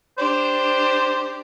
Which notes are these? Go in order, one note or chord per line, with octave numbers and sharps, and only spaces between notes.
D4 G4 C5